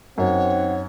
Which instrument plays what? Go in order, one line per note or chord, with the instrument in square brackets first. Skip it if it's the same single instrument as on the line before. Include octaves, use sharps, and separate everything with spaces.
[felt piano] F#2 [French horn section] C4 D#4 [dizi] C#5 [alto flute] F#5